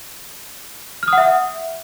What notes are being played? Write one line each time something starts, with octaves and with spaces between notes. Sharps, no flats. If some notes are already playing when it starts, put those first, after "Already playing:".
F6
D#6
F#5
E5